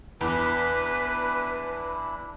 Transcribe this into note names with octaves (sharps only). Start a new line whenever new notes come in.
E2 D4 E4 B4